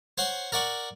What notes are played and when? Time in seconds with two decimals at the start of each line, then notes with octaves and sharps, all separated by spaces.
0.18 C5 C#5 F#5 C6
0.52 A#4 D5 F#5 C#6